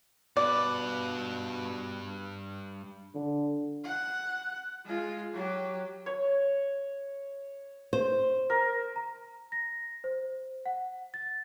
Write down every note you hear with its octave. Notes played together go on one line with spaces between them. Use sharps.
G2 B2 B4 D5
D3
F#5
G#3 F4
F#3 G4
C#5
C5
A#4
A#5
A#6
C5
F#5
A6